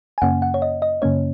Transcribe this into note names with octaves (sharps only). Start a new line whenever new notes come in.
G#5
F#2 C#3 A#3 C#4 F#5
F#5
C#5
D#5
D#5
F#2 C#3 A#3 C#4 C#5